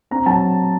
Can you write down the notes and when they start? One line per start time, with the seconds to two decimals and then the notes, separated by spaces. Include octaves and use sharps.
0.11 C4 A#5
0.26 F#3 A5